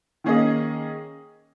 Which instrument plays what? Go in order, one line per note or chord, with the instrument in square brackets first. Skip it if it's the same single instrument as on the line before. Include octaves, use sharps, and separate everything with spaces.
[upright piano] D#3 A#3 C#4 G#4 D#5